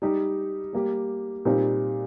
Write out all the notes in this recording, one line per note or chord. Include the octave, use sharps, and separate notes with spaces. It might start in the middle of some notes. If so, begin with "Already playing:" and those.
G3 D#4 G4
G3 A#3 G4
A#2 G3 C4 D#4 G4